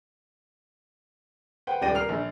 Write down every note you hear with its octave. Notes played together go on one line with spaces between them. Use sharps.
B4 C5 F#5 G5
D#1 C#2 D5 G5 A#6 D#7
A#4 F6 C7 F7
A#1